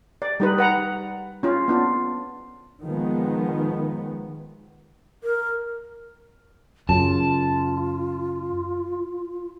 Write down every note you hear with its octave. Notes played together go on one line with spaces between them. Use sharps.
D5
G3 D#4 B4
B4 F#5 A#5
C#4 F4
B3 D4 F4
D#3 F3 G#3 B3
A#4
F#2 C#3 F4 A5